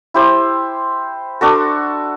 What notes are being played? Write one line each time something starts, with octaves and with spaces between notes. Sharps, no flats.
E4 G4 C5
D4 F#4 A4